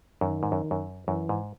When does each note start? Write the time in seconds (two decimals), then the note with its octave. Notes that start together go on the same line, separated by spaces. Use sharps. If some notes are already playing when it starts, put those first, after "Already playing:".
0.21 F#2 D#3
0.43 G#2
0.52 F#2
0.71 F#2
1.08 F#2 E3
1.29 G#2